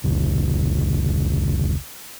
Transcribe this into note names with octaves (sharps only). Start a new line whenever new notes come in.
F1 C#2